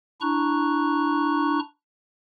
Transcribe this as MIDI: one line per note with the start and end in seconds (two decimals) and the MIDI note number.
0.21 1.59 62
0.21 1.59 64
0.21 1.59 82
0.21 1.59 85
0.21 1.59 90